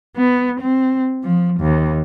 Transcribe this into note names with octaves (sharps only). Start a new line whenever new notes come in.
B3
C4
F3
D#2